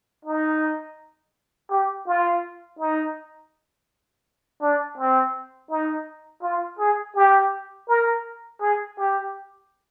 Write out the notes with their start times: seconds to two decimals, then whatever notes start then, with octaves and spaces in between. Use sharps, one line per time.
0.25 D#4
1.70 G4
2.07 F4
2.79 D#4
4.61 D4
4.98 C4
5.71 D#4
6.43 F4
6.79 G#4
7.16 G4
7.88 A#4
8.61 G#4
8.97 G4